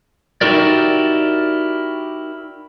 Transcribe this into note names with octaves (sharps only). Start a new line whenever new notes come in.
D#4 E4 F#4 G4 A#4 D5